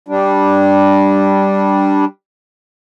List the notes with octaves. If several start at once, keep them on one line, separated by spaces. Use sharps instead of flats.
G3 D4